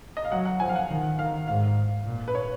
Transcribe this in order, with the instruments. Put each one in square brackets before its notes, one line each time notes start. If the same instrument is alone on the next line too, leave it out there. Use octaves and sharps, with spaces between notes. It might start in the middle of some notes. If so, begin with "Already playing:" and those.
[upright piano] D#5
F5
[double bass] F#3 [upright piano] F#5
[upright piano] F#5
[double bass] F3 [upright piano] G#5
[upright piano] F5
F#5
[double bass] D#3
[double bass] D#3 [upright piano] F5
[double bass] G#2 [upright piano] F5
[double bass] A#2
[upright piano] B4
C#5